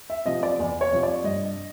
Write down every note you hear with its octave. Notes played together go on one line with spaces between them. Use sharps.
E5
C3 F3 D#5
D5
E2
C#5
C3 F3
D5
G2 D#5